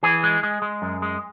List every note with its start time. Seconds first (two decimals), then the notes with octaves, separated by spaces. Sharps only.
0.03 E3 G#4
0.24 G#3
0.43 G#3
0.62 G#3
0.82 F#2
1.02 G#3